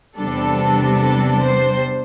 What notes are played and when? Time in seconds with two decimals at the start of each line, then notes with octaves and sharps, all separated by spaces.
0.17 E2 C3 G3 D4 A4
0.99 A4
1.40 C5